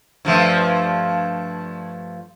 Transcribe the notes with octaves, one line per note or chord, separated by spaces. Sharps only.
G2 F3 A3